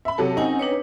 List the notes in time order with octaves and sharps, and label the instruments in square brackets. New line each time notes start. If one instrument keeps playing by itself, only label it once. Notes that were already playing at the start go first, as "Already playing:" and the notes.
[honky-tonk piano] E5 B5
C3 F#3 A4
[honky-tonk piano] C4 D#4 [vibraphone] C#4 F#5 G#5
[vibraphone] D4 B4 C#5